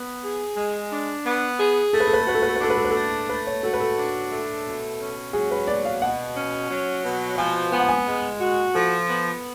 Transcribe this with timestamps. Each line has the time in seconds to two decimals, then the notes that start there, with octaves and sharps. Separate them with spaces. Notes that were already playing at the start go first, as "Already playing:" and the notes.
Already playing: B3
0.23 G#4
0.56 G#3
0.91 D4
1.25 B3
1.59 G#4
1.93 A3 A4
2.00 B4
2.07 A4
2.13 B4
2.20 A4
2.27 F#4 B4
2.34 A4
2.42 B4
2.49 A4
2.56 B4
2.61 D4 A4
2.70 B4
2.77 A4
2.85 B4
2.91 A3 A4
3.29 A3 B4
3.47 C#5
3.63 F#4 A4
3.73 B4
3.80 A4
3.98 D4
4.31 A3
4.66 B2
5.00 C#4
5.33 F#3 G#4
5.51 B4
5.67 B2 D5
5.85 F5
6.02 B2 F#5
6.36 C#4
6.71 F#3
7.04 B2
7.38 F3 G#5
7.72 B3 G#5
7.80 F#5
7.89 G#5
8.07 G#3
8.40 F#4
8.74 F3 A4
9.08 B3